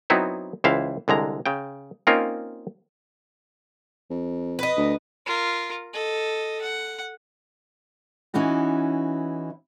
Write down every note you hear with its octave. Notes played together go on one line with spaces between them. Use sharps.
F#3 B3 C4 D#4 E4
C#2 E3 E4 C5 F5
C2 D3 G#3 A#5
C#3 G5
A#3 C4 C#4 D#4 F4 A#4
F2
B4 D#5
D2
F4 A#4
A4 D#5
F#5
E3 C#4 D#4 E4 F#4